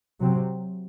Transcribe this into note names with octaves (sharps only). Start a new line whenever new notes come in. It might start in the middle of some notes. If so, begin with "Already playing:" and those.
C3 F#3 C4